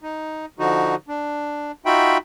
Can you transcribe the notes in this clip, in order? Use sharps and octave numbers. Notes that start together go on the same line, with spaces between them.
D#4
D3 F3 D#4 F#4
D4
D#4 F4 F#4 E5 G5 B5